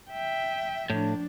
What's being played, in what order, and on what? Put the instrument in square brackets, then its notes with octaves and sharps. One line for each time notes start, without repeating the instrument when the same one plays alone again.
[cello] E5 G5
[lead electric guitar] A2 [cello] F3 D4